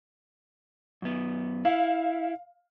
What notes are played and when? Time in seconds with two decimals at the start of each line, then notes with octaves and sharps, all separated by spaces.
1.02 F#2 B3
1.65 E4 F5